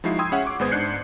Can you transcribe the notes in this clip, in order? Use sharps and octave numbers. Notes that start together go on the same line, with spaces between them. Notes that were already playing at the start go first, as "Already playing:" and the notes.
F3 G#3 D#4 E4 F#4 C7
G5 B5 C6 D#6 E6 G#6
C#4 G#4 E5 F#5
C#6 D6
G#1 G#3 B3 C5 D#6 G#6
G#2 D4 F#6 G6 C7 C#7